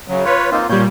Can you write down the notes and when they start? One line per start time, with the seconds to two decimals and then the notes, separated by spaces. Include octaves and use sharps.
0.08 F#2 C#3 F#3
0.25 F4 B4 C#5
0.51 A#3 C4 D#4 F4
0.69 A#2 G3 C#5 G6